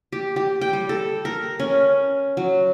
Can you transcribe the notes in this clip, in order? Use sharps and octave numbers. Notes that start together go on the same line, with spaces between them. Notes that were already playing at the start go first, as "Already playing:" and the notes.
G4
G4
G5
G3
A4
A#4
C#4
F#3